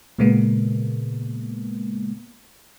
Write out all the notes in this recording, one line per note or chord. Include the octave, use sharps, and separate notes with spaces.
A#2 C#3 G#3 A#3 B3